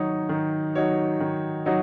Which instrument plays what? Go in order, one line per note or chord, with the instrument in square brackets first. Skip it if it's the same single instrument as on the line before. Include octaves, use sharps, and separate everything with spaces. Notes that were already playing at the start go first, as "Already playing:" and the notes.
Already playing: [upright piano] D#3 F#3 D#4 F#4 C#5
D#3
F#3 D#4 F#4 C#5
D#3
F#3 D#4 F#4 C#5